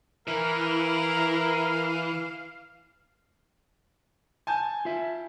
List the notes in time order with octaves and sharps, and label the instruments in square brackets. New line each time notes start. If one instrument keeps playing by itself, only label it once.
[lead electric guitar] E3 [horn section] E4 A#4 [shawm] F5
[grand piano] G#5 A5 G6
[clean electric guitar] F4 E5